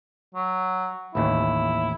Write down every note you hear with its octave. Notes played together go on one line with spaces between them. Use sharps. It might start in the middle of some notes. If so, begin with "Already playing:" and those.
F#3
A1 D#2 E4